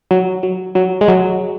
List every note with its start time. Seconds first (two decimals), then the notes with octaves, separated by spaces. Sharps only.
0.11 F#3
0.43 F#3
0.75 F#3
1.01 G#3
1.08 F#3